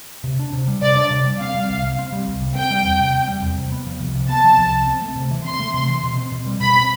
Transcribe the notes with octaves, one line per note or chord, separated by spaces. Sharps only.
C3
D4
C3
G3
C3 D5
D4
C3
G3
C4 F5
G3
C2
C3
C4
G3
C2
C3
C4 G5
G3
E2
C3
C4
G3
E2
C3
B3
F3
C2
C3
B3 A5
F3
C2
C3
C4
A3
C3
E3
C4 C6
A3
C3
E3
B2
C4
B2
G3
B2 B5
C4